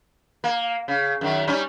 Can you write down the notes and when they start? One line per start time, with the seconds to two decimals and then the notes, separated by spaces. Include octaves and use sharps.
0.44 A#3
0.88 C#3
1.21 F#2 D#3
1.47 G3 C#4 D#4